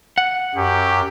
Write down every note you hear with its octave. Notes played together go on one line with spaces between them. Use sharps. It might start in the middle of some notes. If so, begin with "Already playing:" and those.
F#5
F#2 G4